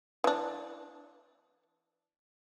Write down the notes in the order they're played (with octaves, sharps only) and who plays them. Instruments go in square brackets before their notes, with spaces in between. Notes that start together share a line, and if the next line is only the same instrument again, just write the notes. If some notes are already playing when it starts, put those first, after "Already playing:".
[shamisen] E3 D4